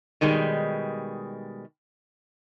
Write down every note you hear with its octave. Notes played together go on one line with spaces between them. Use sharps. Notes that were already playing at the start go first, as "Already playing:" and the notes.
B2 D#3 G3 G#3